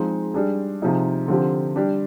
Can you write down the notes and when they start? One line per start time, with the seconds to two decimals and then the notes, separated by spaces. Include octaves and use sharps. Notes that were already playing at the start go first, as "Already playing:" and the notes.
Already playing: F3 G#3 C4 D#4 G#4
0.34 G3 D4 G#4
0.82 C3 F3 C4 D#4 G#4
1.28 D3 F3 C4 G4
1.76 G3 D4 G4